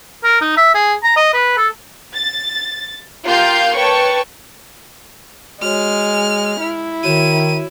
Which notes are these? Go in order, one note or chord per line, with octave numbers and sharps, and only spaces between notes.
A#4
D#4
E5
G#4
A#5
D#5
B4
A4
A6
A#3 F4 G4 F5 C6 G6
B4 C#5 G5 A5 C#6
G#3 F#4 C#5 F6
E4
D#3 F#4 C#5 D#7 E7